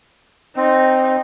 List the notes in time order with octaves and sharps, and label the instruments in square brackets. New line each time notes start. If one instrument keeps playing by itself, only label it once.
[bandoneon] C4 [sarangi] D#4